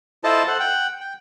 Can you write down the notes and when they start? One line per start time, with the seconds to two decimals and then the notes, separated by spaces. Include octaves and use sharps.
0.24 E4 F4 A4 C5 D#5 A5
0.48 A4 C5 F#5
0.60 F#5 G5
1.01 G5